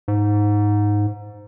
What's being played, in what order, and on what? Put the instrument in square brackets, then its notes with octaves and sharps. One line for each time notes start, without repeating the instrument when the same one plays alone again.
[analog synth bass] G#2